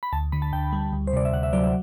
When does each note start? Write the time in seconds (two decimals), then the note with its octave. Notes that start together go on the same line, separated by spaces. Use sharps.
0.03 B5
0.12 D2 A5
0.32 D3 B5
0.42 A5
0.53 D2 G5
0.73 G3
0.93 D2
1.07 C5
1.13 C3 D5
1.25 E5
1.33 D2 F#5
1.43 E5
1.53 F#3 D5
1.64 E5